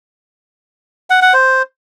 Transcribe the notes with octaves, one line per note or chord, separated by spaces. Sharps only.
F#5
F#5
C5